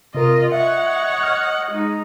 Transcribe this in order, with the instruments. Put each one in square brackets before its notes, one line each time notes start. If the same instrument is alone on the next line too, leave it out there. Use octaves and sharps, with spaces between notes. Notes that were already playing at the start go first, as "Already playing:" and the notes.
[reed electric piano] C3 A#4 [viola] F4 D#5
[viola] C#5 F#5 [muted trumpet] D#5 [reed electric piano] E5
[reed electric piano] F6
[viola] G#3 D#4